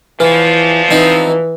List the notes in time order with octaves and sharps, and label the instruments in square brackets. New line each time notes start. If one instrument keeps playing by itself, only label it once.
[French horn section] E2 F3 [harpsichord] E3 [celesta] B4
[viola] E3 [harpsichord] C4 D#4